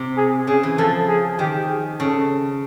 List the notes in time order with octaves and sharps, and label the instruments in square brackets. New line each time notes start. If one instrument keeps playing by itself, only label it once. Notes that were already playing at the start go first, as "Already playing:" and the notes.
Already playing: [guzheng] C3
[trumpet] G#4
[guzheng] C#3 [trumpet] G#4
[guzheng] E3
[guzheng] F3 [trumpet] A4
[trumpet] G#4
[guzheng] D#3 [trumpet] G4
[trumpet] G#4
[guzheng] C#3 [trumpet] A4